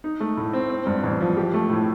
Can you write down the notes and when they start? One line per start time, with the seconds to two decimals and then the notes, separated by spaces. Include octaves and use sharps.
0.04 D#4
0.20 A3
0.37 A2
0.54 C4
0.70 C4
0.87 G2
1.03 A1
1.21 F3
1.37 G4
1.54 A3
1.70 A2